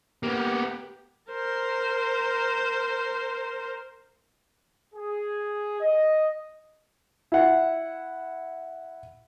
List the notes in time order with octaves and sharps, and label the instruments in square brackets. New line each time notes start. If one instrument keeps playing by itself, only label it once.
[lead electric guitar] A#3 B3 [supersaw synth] G4
[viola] A#4 C5
[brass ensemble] G#4
D#5
[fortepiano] E4 F#5